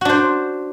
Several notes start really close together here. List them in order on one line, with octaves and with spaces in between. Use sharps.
F#4 D4 C5